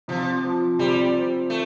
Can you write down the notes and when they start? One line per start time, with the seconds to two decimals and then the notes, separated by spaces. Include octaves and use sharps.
0.08 C3 F3
0.44 F3
0.79 C3 G3
1.14 C4
1.50 A3